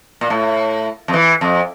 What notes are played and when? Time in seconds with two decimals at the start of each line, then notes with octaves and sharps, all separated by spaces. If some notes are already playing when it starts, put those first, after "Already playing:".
0.21 A#2
0.30 A2
1.08 F2
1.13 E3
1.41 F2